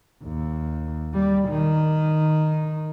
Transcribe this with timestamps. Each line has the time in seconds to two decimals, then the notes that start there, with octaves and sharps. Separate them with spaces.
0.24 D#2
1.13 G3
1.49 D#3